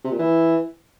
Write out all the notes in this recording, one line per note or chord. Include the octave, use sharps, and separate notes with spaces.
C3
A#2
E3